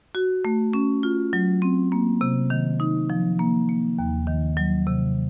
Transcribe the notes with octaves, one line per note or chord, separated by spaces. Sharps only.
F#4
A3
C#4
F4
F#3
C4
A#3
C3
D#3
D#4
F3
A#3
A#3
D#2
D#3
F#3
C3